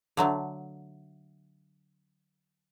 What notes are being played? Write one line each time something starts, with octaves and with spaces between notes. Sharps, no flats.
D3 F#3 A3